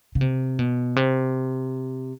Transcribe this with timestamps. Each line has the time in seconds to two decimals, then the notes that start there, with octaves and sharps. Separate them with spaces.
0.15 C#3
0.21 C3
0.59 B2
0.96 C3